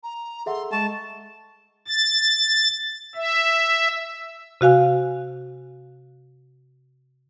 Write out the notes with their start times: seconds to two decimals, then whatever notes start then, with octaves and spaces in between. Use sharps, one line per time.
0.03 A#5
0.46 G#4 A4 E5 F#5 C6
0.72 G#3 E5 A5 C#6
1.88 A6
3.15 E5
4.61 C3 F#4 F5 G#5